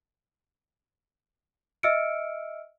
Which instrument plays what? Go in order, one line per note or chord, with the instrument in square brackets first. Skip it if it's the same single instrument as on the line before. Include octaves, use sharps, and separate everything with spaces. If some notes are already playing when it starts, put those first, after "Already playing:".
[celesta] D#5 E5 E6 F6 C#7 D7